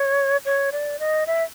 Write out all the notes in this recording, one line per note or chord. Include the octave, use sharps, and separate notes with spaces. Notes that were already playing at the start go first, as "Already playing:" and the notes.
Already playing: C#5
C#5
D5
D#5
E5